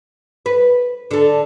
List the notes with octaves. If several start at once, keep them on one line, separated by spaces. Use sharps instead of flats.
B4
D3 A4